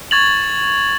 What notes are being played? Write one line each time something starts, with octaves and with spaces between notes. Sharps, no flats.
C#6 G#6 A6 F7 F#7